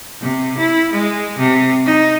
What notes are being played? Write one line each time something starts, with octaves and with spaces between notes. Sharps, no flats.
C3
E4
G#3
C3
D#4